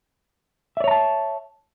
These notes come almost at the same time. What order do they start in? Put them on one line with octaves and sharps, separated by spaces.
E5 D5 C#5 A#5 A5